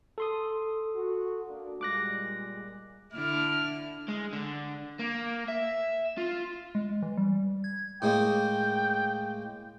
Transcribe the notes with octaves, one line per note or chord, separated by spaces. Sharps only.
A4 C6 D#6
F#4
A#3 D4
A#2 G3 G#3 D6 F#6 A#6
D3 D4 E4 F6
G#3
D3
A#3
E5
F4
G#3
E3
G3
G#6
A2 G#3 A#3 G5